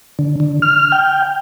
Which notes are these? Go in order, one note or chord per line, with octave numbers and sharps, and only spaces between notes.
D3
D3
F6
G5